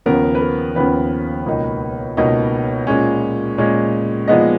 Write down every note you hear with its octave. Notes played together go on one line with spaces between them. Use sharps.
D#2 C#3 F3 B3 A#4
B4
A#4
D#2 C#3 F3 B3 B4
C#2 B2 A#3 D#4
C#2 B2 A#3 D#4
A#2 G#3 C#4
A#2 G#3 C#4
A#2 F3 G#3 B3 D#4 D#5